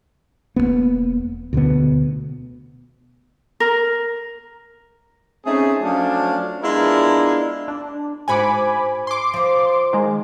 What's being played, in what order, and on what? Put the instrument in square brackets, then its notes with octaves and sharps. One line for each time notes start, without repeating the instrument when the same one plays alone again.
[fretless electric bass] E1 G2 A#3 B3
D2 B2 D3 B3
[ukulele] A#4
[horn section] A3 C4 C#4 D#4 G#4
F3 F#3 A3 C#4 D4
G#3 B3 D4 E4 F4 A#4
[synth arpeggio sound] D4
[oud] G#2 F#4 C5 [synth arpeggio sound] G#5 B5 D6
[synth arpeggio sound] C6 D6
[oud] F3 C5
[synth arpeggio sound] D#3 G#3